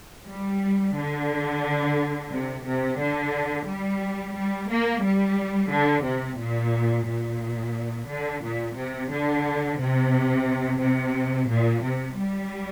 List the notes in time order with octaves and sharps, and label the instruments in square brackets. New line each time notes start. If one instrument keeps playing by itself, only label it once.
[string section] G3
D3
C3
C3
D3
G3
G3
A#3
G3
D3
C3
A#2
A#2
D3
A#2
C3
D3
C3
C3
A#2
C3
G3